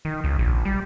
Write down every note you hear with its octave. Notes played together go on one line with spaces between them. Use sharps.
D#3
C#2
A#1
G3